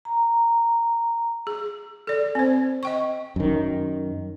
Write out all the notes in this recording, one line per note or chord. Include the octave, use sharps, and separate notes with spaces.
A#5
G#4
A4 D5
C4 C5
D#5 G5 C#6
F#2 D#3